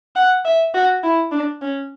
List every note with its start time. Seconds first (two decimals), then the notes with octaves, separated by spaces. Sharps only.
0.16 F#5
0.45 E5
0.74 F#4
1.04 E4
1.32 D4
1.62 C#4